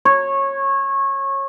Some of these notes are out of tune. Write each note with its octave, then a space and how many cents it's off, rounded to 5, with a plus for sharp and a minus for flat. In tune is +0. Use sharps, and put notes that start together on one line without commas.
C#5 -20